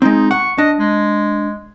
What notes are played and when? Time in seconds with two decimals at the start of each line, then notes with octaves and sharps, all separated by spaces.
0.02 G#3 C4 D#4
0.31 F#5 C#6
0.58 D4 D#5
0.79 G#3